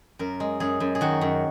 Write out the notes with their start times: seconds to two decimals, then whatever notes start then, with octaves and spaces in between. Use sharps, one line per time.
0.19 F#2 A#4
0.40 G#3
0.60 F#2 G#4
0.80 F#2
0.95 G#4
1.01 D#3 F#4
1.21 F#2